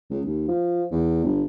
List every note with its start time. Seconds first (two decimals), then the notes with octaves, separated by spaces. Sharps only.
0.10 C#2
0.25 D#2
0.48 F3
0.91 E2
1.24 G1